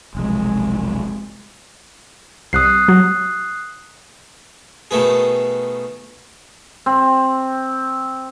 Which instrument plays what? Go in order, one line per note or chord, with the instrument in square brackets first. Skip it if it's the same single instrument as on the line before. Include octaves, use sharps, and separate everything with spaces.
[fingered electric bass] F1 B1 F2 [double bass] G#3
[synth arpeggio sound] C2 [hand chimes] D#6 F#6 C7
[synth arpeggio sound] F#3
[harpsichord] B2 D#3 A3 B3 G#4
[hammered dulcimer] C4